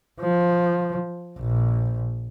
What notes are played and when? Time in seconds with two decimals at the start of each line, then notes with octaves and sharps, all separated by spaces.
0.21 F3
1.39 A#1